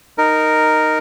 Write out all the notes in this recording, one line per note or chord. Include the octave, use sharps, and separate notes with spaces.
D#4 A#4